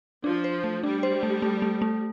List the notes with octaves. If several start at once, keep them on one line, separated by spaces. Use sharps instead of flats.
F3 D4
C5
A3
G3 D4
C5
A3
A3
A3
A3